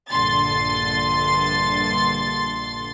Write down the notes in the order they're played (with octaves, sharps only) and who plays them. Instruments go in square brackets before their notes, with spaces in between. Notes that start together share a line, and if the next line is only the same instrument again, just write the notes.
[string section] A#1 G2 D3 C6 A6